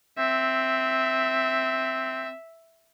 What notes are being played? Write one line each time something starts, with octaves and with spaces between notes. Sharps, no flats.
C4 E5